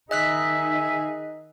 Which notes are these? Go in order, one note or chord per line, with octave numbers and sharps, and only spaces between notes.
D#3 D#4 G#4 D#5 E5 F#6 B6